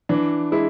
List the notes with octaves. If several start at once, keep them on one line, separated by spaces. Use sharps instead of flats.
E3 D4
G#3 E4